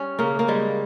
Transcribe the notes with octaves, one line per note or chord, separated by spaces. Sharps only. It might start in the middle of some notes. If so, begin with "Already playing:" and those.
Already playing: G3 C#4
C#3 A#3
A#3
G3 G#3